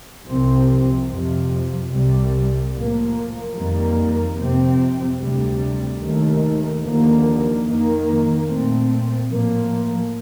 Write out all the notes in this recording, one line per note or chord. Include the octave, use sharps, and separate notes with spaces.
C2 C3 F3 C4
F2 C3 F3
C2 C3 G3
A2 F3 A#3
F2 D#3 G3 A#3
F2 C3 F3 C4
D2 C3 G3
D#2 D#3 A3
D#2 D3 F3 A#3
F2 D#3 A#3
A#2 A3 C4
A2 F3 A#3